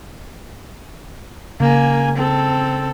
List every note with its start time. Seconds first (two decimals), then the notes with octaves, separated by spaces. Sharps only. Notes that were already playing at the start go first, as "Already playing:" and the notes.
1.60 C#3 A#3 G#5
2.16 C4 A4